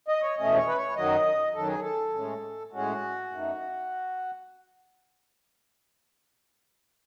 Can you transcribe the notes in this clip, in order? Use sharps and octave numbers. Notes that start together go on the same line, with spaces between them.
D#5
C#5
E2 B2 A3 C#4 D#5
C#5
B4
C#5
F#2 D#3 F#3 D#5
F#2 D#3 F#3 A4
G#4
A4
A2 G#3 C#4
A2 G#3 C#4 F#4
F#2 D#3 A3